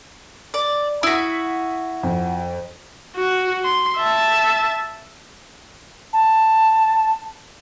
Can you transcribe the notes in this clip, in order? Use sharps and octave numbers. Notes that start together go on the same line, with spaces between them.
D5
E4 F#4 D#6 B6
F2
F#4
C6
E5 A5
A5